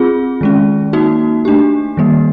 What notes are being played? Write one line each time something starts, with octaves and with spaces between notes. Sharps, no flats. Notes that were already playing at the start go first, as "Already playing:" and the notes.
Already playing: C4 F4 G#4
D#3 G#3 C#4
A#3 D#4 F#4
A3 D4 G4
D#3 G3 A#3